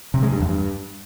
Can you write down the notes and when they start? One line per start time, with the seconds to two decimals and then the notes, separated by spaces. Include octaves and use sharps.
0.14 C3
0.23 G#3
0.31 G2
0.40 E2
0.49 G2